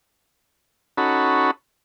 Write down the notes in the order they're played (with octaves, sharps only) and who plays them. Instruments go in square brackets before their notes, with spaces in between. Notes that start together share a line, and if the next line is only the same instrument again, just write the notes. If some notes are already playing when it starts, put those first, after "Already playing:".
[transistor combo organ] C#4 D#4 F#4 A4 B5